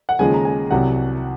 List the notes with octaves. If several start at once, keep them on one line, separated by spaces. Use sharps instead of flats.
F#5
D#2 C#3 F3 G#3 G#5
A#5
G#5
C2 C3 F#3 F#5